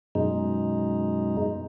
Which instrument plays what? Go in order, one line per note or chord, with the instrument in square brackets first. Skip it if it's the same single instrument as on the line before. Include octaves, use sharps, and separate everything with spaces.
[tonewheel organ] F#2 B2 G#3 D#4